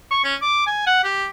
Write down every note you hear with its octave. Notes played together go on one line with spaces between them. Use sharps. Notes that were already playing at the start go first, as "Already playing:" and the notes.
C#6
C#4
D6
G#5
F#5
G4